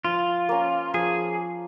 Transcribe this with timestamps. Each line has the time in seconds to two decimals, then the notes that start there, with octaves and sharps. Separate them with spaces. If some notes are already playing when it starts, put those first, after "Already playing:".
0.04 F3 F4
0.49 A#3 C#4
0.94 F3 G#4